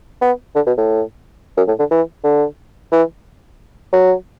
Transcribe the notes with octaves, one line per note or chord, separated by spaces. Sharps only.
B3
D3
B2
A2
F#2
A2
D3
E3
D3
E3
F#3